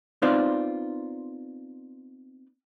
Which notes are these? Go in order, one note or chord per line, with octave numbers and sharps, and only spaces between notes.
B3 C4 D#4 F4 C5 D5